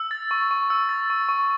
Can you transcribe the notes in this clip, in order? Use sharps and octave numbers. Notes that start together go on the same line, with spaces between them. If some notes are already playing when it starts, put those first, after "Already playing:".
Already playing: E6
A6
C#6
C#6
E6
A6
C#6
C#6